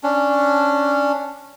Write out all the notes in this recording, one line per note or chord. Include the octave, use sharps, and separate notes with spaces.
C#4 D4